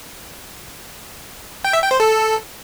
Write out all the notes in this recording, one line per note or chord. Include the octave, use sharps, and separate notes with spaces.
G5
E5
G5
C5
A4